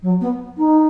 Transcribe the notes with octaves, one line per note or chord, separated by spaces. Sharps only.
F#3
B3
D#4